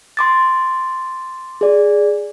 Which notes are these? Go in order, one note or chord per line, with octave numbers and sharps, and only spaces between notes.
C6 D6 A6
G#4 D5